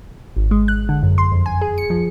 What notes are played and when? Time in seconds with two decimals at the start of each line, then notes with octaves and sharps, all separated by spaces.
0.37 G#1
0.51 G#3
0.68 F#6
0.89 D3
1.03 F#2
1.18 C6
1.32 F2
1.46 G#5
1.61 G#4
1.78 C#7
1.90 F3